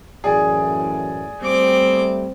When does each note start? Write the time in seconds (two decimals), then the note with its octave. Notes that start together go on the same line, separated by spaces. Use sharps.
0.24 F#2 A2 E3 G#4 D5
1.41 G3 A3 C4 D6